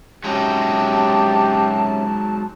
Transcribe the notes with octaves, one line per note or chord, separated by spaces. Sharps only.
C3 F#3 G#3 C#4 D#4 G4 A5